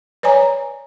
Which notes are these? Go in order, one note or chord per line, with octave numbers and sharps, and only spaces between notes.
B4 C#5 D5 G#5 A#5